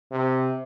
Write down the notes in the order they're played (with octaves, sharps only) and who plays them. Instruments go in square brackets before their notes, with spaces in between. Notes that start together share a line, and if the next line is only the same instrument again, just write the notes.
[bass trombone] C3